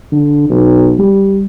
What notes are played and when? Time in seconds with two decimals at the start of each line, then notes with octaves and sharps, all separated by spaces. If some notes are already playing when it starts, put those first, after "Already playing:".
0.12 D3
0.50 B1
0.99 G3